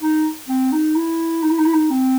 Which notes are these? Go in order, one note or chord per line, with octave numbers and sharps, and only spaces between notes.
D#4
C4
D#4
E4
D#4
E4
D#4
E4
D#4
C4